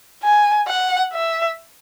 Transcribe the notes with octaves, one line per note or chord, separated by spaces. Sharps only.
G#5
F#5
E5